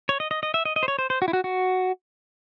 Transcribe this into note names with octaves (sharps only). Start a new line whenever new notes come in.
C#5
D#5
D#5
D#5
E5
D#5
D#5
C5
C#5
C5
C5
F#4
E4
F#4
F#4